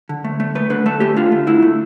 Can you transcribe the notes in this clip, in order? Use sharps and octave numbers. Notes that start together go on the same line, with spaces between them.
D3
A3
A3
A3 B4
D3 B4
A3 A4
A3 G4
D3 F4
A3
D3 E4
A3